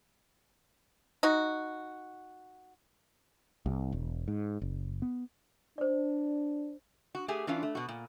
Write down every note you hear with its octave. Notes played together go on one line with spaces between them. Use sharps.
D#4 F#4
C2
E1
G#2
F#1
B3
D4 C5 D5
F#4
A3 G4 G#4 G#5
E3 C#4 D4 F4 F5
A3
B2 F#4
A#2